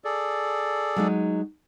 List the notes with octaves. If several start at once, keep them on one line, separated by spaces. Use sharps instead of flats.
G#4 A4 D5
F#3 G#3 D#4